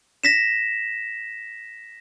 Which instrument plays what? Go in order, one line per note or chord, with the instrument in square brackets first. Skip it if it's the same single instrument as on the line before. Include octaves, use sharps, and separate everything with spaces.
[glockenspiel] A#6 B6 E7